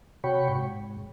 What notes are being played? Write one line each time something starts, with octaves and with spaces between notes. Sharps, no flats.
C3 F#4 C#5 G5 B5 C#6
G#2